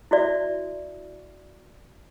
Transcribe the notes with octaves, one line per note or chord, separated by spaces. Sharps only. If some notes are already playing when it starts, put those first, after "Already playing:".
E4 F#4 D5 E5